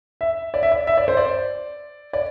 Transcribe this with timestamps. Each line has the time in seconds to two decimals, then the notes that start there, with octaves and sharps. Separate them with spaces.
0.21 E5
0.54 D5
0.63 E5
0.72 D5
0.87 E5
0.97 D5
1.08 C5
1.17 D5
2.13 D5